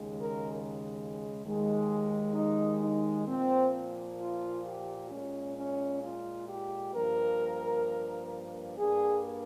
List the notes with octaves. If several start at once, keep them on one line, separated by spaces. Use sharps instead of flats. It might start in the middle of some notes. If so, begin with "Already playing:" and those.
Already playing: D#2 C#3 G#3
A#4
D#2 D#3 G#3
D#4
D#4
A#2 F3 A#3 C4
F4
G4
A#2 G#3 C#4
C#4
F4
G4
G2 F3 A#3 A#4
G2 G3 A#3 G#4